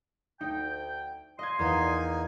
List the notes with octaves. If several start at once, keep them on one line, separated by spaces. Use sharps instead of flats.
D2 D#4 G5
A#2 D#5 C6 G#6
E2 A#3 D#4 G#5